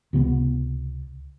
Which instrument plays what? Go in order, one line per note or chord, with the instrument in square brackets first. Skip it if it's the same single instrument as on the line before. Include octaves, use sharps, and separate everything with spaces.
[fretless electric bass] C#2 C3 B3